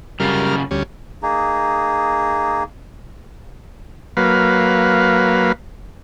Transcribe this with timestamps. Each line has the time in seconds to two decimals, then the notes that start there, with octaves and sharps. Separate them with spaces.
0.20 F#2 C#3 G3 F4 A#4 F6
0.71 D2 G3 C#4
1.23 A#3 D#4 G#4
4.17 F#3 A#3 B4 F5